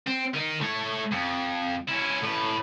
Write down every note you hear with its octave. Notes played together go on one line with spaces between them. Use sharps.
C4
D#3 D#4
A3 C#5
F2
C#4 E4
A2 B4